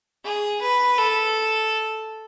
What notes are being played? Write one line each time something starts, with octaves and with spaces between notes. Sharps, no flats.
G#4
B4
A4